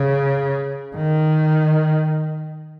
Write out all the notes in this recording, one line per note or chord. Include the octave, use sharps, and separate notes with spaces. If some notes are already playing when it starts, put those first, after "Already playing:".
Already playing: C#3
D#3